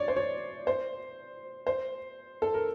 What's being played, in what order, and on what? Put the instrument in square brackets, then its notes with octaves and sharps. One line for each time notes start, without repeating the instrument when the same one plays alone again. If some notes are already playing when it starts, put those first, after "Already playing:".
Already playing: [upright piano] C#5 D5
C5
C#5
C5
C5
A4
A#4